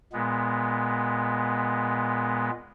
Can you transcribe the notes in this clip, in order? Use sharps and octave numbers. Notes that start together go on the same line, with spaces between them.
A#2 G#3 B3